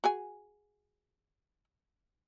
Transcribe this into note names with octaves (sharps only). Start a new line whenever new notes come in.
F#4 G#4 G#5